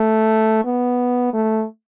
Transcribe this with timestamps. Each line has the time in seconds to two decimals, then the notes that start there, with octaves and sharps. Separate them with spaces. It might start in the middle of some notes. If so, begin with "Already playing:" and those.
Already playing: A3
0.65 B3
1.33 A3